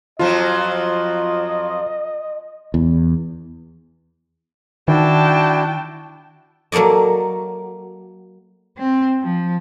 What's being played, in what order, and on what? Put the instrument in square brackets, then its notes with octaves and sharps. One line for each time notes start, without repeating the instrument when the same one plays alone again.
[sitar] F2 F3 F#3 [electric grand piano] F4 [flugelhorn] D#5
[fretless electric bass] E2
[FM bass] D#3 [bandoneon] D4 E4 F#4 [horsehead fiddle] G5 A5
[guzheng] F#3 A#3 A4 D5 D#5
[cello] C4
F3